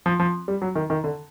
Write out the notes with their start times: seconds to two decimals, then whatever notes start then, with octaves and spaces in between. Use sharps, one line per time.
0.06 F3
0.20 F3
0.48 G3
0.62 F#3
0.75 D#3
0.90 D#3
1.04 D3